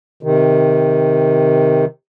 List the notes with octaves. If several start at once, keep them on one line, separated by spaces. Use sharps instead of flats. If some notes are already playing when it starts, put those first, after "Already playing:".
C3 D#3